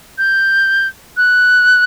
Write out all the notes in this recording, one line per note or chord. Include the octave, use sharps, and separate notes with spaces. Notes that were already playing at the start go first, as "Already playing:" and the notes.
G6
F#6